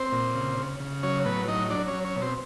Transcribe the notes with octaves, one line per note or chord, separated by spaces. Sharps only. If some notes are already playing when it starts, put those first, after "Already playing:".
Already playing: C4 C5
A#2
C#3
C#3
C#3
F#3 C#4 C#5
A2 B3 B4
F#3 D#4 D#5
F#3 D4 D5
C#4 C#5
F#3
C#4 C#5
B2
C4 C5